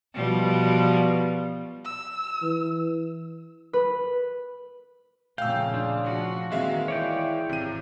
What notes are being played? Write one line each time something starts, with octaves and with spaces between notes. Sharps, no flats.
B2 F3 G3
E6
E3
B4
A#2 C#3 F3 A3 F5 G5 E6
D4 F4
F3 F#4
D#3 E3 G#3 A#3 C4 F#4 E5 F5
E4 C#5 D5 G5
G#1 C3 D#7